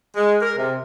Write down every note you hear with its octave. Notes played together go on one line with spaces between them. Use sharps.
G#3
A#4
C3